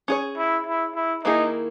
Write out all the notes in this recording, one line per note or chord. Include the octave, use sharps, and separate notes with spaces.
C#4 G#4 C#5
E4
E4
E4
D#3 A#3 D#4 E4 G#4